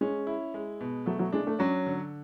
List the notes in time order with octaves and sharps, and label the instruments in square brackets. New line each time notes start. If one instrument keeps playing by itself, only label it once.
[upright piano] G#3 [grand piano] C#4
[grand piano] E4
G#3
B2
[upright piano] F#3 [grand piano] A3
[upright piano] F#3
[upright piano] G#3 [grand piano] D4
[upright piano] A3
[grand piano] F#3 [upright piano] C#4
[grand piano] D3